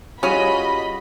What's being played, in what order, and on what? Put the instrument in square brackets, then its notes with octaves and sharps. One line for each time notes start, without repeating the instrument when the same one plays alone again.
[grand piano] G3 F4 F#4 [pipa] C#4 G#4 [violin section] D#5 B5